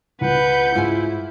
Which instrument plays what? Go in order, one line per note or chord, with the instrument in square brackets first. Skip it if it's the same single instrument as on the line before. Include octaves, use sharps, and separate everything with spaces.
[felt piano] C#2 [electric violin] B4 G6 [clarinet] F#5
[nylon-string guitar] G#2 G#5 [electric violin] E4 [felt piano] F4